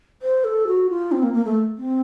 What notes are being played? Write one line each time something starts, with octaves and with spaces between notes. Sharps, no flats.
C5
A4
F#4
F4
C4
A#3
A#3
A3
C4